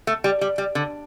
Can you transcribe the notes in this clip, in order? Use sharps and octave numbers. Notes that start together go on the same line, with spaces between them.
A3
G3
G3
G3
D3